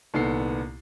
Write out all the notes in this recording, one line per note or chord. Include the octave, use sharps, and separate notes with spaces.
C2 A#2 D#3 B3 A4 C7